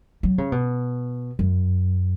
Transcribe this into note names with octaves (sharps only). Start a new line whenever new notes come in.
F#3
C#3
B2
F#2